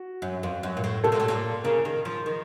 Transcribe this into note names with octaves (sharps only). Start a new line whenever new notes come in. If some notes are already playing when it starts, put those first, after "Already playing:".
Already playing: F#4
F#2
F2
F#2
A#2
A2
C3 A4
A#2
A2
A#2
C#3 A#4
D#3
F3
D#3